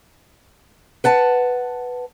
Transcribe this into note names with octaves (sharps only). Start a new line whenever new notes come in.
B4 F#5 A5